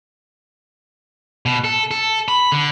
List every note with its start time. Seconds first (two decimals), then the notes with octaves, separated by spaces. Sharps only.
1.46 B2
1.64 A4
1.91 A4
2.28 B5
2.52 D3